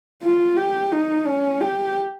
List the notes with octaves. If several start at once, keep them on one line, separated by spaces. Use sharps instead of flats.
F4
G4
D#4
C#4
G4